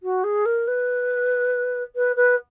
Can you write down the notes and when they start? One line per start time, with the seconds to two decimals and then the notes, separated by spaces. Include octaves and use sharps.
0.03 F#4
0.24 G#4
0.45 A#4
0.67 B4
1.95 B4
2.16 B4